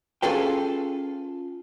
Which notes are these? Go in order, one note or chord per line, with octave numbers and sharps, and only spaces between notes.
C#4 F4 G#4 A4 B4 G5